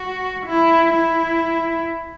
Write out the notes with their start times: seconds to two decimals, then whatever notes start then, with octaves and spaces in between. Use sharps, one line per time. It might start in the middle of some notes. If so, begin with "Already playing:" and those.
Already playing: F#4
0.47 E4
0.94 E4